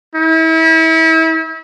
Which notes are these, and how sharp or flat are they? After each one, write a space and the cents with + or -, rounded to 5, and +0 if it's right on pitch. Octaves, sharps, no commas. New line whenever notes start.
E4 -35